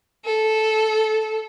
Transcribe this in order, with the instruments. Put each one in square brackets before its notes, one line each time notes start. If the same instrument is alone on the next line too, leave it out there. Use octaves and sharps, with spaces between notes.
[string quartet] A4